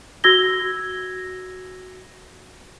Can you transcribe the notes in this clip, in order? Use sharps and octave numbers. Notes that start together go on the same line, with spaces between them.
F#4 E6 G#6 A#6 G7